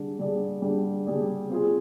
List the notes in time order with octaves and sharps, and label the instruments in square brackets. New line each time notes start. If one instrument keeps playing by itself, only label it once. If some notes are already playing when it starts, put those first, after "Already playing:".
Already playing: [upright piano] D3 G3 D4 G#4 D5
D3 G3 D4 G#4 D5
D3 G3 D4 G#4 D5
D3 G3 D4 G#4 D5
C4 F4 G#4